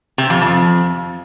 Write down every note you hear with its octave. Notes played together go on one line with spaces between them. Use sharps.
C3
F2
F2